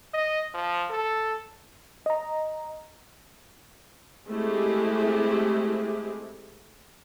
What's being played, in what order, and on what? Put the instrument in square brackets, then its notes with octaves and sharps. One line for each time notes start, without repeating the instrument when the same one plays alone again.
[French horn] D#5
F3
A4
[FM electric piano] D#5 A#5
[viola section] G#3 A3 C4 E4 G4